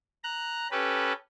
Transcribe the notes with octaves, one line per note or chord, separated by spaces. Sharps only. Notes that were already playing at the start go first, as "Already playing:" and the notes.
A#5 F#6
C#4 G4 A4 B4